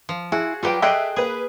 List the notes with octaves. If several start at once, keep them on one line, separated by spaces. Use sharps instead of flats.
F3
E4 F#4 G#4
F#3 G3 F4 G4 B4 G5
G#4 A4 C5 D#5 E5 G5 F#6 D7
A#3 G#4 B4